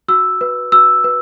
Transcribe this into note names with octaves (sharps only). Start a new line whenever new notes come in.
F#4 E6
B4
F#4 E6
B4